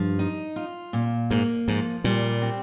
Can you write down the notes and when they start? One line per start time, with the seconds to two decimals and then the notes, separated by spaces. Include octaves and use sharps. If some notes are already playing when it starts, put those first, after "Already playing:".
Already playing: G2 F3
0.19 D#4
0.56 F4
0.93 A#2
1.30 G#2 A#3
1.68 G#2 F3
2.04 A#2 G3
2.42 C4